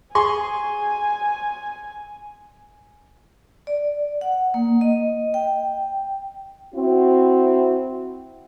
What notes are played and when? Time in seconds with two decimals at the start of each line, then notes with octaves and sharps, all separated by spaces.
0.15 G#4 G#5 C6 C#6
3.67 D5
4.21 F#5
4.54 A#3
4.81 D#5
5.34 G5
6.75 C4 E4 F#4